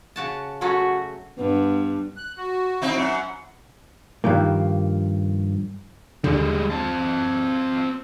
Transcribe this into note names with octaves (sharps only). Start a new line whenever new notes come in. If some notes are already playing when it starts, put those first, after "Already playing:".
C#3 F#4 A5
F#3 A3 C#4 F#4
G2 B3
F#6
F#4
C4 D#4 E4
F#2 F#5
G2 D#3 F3 A#3
D#2 D3 G3 G#3
C4 A5